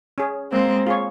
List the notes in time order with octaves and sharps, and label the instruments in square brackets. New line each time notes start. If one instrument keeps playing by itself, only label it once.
[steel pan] C#4 G#4
[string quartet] G#3 C4 [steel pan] A#3
[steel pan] F4 G#4 C#5